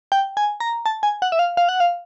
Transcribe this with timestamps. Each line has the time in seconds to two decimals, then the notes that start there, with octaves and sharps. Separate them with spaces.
0.12 G5
0.37 G#5
0.60 A#5
0.86 A5
1.03 G#5
1.22 F#5
1.32 E5
1.39 F5
1.57 F5
1.69 F#5
1.80 F5